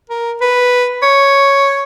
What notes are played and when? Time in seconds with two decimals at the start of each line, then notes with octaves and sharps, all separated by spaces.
0.10 A#4
0.41 B4
1.03 C#5